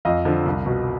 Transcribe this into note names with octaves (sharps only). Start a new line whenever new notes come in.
F2 D#5 F5
D3 F3
C2
B2